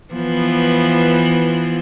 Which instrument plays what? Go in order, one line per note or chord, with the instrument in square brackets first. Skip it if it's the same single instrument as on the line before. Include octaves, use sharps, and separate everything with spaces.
[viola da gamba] E3 F3 B3